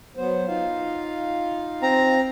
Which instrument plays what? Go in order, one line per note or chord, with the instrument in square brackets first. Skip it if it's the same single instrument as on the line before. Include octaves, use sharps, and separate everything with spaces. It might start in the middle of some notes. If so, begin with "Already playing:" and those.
[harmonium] F#3 B3 C5
D#4 F4 F5
[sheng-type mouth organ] C4 A#5